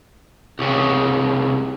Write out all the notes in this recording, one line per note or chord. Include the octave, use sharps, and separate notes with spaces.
C2 C#3